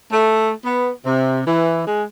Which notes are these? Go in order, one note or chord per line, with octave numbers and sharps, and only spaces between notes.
A3
B3
C3
E3
G#3